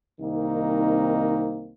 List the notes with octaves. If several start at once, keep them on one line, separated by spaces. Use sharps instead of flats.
C2 D#3 A#3 C4 D#4